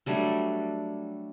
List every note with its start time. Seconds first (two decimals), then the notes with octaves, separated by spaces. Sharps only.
0.06 F#3 G3 A3 D4